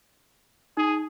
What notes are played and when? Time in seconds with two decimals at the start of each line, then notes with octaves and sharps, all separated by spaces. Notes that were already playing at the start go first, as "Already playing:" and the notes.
0.77 D#4 G#4